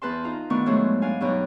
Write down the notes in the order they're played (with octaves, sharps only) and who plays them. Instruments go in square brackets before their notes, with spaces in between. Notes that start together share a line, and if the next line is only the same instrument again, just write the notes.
[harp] E2 B4 A5 C6
D#4 F4 A#5
D#3 A3 B3 D4 C#6
G#2 F3 F#3 G#3 A3 F#4
B3 D4 F5 G#5
G2 B2 F#3 D#4 D5 A#5